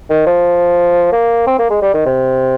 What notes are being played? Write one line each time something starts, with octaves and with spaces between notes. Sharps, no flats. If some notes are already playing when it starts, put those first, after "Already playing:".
D#3
F3
A#3
C4
A#3
G#3
G3
D#3
C3